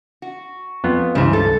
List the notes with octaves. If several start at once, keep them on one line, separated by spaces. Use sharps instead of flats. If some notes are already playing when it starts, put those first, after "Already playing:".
F#4
F2 B3 F4
C#2 G2 C#3 E3 C5
A4